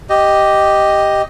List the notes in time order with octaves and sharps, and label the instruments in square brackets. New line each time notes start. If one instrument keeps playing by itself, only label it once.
[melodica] G4 D#5